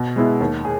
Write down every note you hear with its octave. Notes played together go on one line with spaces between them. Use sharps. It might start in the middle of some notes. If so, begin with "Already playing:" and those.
Already playing: B2
G#3 B3 E4
D#2
G#4